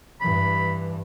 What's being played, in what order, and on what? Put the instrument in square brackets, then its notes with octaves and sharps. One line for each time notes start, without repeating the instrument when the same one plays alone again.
[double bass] G2 E3 [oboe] B5